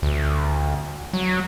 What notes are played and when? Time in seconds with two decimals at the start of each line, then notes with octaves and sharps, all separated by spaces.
0.03 D2
1.13 F#3